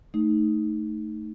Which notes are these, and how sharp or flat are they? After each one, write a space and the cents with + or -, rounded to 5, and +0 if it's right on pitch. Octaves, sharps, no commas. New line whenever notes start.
A3 +0 D#4 +0